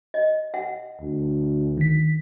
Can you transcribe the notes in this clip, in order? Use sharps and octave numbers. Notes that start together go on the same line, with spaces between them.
D#5
F#5
D2
D#3 B6